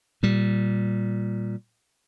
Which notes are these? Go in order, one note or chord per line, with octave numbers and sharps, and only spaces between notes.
A#2 G3